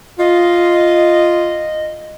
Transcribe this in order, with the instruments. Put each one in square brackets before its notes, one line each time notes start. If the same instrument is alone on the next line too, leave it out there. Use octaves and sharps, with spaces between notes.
[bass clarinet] F4 [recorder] D#5